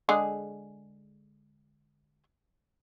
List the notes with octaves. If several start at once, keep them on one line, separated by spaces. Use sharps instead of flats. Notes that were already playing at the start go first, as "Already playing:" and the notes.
D3 G#3 G#4